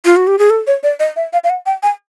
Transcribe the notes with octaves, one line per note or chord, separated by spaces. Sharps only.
F4
F#4
G4
G#4
A4
C#5
D5
D#5
E5
F5
F5
F#5
G5
G#5